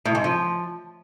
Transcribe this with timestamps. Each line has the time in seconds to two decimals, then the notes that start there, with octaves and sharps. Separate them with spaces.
0.05 A2
0.15 G#2
0.24 F3